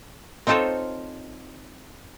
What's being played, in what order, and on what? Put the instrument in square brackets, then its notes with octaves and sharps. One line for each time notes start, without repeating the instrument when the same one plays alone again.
[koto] C4 D#4 F4 A4 C5 C#5